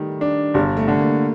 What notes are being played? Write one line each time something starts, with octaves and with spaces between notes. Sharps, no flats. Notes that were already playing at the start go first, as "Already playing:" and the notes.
Already playing: D#3 G3 A3
D4
G1 G3
A3
D3
A#3